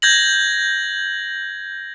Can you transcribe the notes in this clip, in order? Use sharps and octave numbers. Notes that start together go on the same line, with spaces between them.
G6 G#6 A#6 F#7